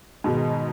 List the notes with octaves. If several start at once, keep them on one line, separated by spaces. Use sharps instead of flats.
G#2 B2 D#3 G#3 B3 D#4